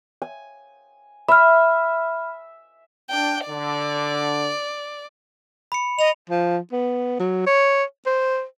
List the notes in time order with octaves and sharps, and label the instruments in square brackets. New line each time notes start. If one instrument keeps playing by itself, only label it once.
[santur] G#5
[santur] E5 [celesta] B5 F6
[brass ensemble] D4 [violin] G5
[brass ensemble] D3 [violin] D5
[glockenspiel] B5 C#7
[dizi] D#5 [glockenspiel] F7
[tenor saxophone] F3
B3
F#3
C#5
C5